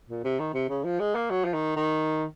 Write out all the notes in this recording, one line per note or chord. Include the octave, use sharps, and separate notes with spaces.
A#2
C3
D#3
C3
C#3
F3
G#3
A#3
F#3
F3
D#3
D#3